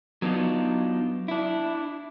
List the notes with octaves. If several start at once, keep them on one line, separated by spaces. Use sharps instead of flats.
F#3 B3 D4 D#4 F4
D4 E4